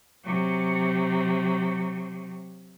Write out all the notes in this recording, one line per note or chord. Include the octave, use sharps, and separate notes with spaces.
C3 F#3